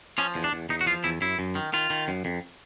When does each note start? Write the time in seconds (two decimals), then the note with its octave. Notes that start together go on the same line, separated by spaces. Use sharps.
0.18 F3 C#4
0.35 E2
0.44 D4
0.53 E2
0.69 E2 D#4
0.81 F#4
0.86 F3 F4
1.04 E2 E4
1.21 F#2 E4
1.39 F#2
1.55 D#3
1.73 D#3 F4
1.90 D#3
2.08 F#2
2.25 F2